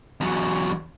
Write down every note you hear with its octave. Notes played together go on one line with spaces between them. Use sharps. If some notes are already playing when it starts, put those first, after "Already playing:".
E2 F#3